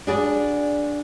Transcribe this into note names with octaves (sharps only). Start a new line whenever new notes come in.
D4 F#4 G#4 B4 D5